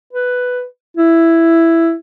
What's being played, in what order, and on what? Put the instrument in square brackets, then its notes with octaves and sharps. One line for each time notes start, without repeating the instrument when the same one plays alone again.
[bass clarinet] B4
E4